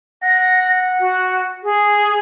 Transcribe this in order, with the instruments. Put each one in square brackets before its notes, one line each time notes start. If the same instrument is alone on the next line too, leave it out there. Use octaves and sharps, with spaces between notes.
[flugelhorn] F#5 [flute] A#6
[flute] F#4
G#4